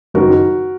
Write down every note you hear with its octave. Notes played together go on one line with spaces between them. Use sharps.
F#1 F#2 D#3 F#4 A#4